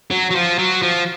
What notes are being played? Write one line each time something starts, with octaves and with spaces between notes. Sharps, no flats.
F#3
F#3
F3
F#3
F3